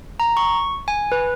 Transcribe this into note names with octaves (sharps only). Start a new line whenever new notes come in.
A#5
C#6
G#5
B4